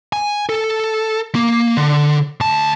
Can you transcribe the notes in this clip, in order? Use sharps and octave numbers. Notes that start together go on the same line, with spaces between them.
G#5
A4
A#3
D3
D2 A5